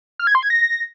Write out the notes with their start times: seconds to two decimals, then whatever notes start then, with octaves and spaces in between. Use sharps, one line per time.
0.19 F6
0.27 G#6
0.35 C6
0.42 G#6
0.50 A#6